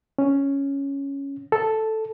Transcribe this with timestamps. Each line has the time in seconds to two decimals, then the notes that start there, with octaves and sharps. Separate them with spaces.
0.19 C#4
1.52 A4